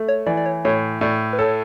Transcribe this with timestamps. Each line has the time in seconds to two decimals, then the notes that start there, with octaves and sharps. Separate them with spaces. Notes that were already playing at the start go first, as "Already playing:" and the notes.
Already playing: A3
0.08 C#5
0.26 E3 D5
0.37 D5
0.46 C#5
0.65 A2 C#5
1.01 A2 D5
1.33 B4
1.39 A4 C#5